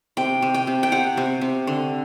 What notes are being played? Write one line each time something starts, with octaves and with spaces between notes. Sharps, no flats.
C3 G5
C3
G5
C3
G5
C3 F#5
C3
C3
D3